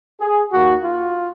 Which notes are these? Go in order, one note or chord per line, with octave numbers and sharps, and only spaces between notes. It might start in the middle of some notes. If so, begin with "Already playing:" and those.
G#4
D#2 D#3 A#3 F#4
F4